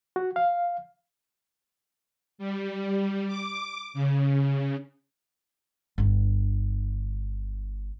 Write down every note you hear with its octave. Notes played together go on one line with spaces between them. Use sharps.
F#4
F5
G3
D6
C#3
G1 D4